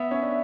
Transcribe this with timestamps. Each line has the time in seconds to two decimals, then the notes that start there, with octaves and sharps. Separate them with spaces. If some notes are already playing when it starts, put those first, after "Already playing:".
Already playing: B3 E5
0.11 C#4
0.22 D4